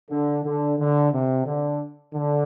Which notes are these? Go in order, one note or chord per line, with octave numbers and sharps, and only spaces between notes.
D3
D3
D3
C3
D3
D3